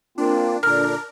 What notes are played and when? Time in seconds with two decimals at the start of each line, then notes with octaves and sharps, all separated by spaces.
0.18 A#3 C4 D4 F4
0.63 A#2 D3 D4 A#4 F6